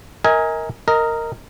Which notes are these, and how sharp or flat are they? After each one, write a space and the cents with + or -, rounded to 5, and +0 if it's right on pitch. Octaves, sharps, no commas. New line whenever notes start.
A#4 +0 D#5 +35 G#5 -10
A#4 -10 D#5 +10